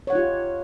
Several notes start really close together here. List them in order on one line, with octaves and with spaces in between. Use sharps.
C#5 F#5 D#4 F4 G4